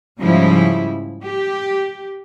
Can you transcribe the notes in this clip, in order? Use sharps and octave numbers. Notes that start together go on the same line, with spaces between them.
G#2 C#3 F3 G3 E4
G4